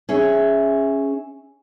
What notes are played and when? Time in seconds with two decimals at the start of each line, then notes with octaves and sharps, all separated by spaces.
0.09 C#4 G#4 E5